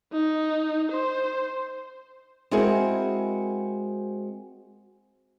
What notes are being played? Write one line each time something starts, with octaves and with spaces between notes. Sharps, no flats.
D#4
C5
G#3 C4 E4 F#4 G#4 A#4